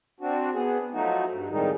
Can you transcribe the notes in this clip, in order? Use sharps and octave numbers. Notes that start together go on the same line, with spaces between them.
C4 D4 F#4
B3 G#4
F3 F#3 A3 D#4 F#4
G2
F2 A2 D#3 G3 G#3 D#4